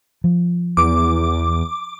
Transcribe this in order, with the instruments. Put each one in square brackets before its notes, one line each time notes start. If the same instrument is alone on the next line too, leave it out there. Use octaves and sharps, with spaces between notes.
[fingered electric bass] F3
[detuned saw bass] E2 [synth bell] D6